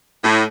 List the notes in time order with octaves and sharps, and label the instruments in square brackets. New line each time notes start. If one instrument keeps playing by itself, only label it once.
[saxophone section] A2